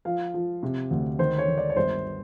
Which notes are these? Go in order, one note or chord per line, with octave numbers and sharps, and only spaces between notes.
F3 F5
F3
C3
D2
D#3 C5
C#5
D#3
D5
C#5
G1 C5